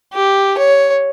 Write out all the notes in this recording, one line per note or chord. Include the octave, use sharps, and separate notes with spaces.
G4
C#5